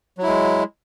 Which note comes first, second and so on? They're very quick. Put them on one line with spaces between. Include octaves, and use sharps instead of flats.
F#3 E4 G#3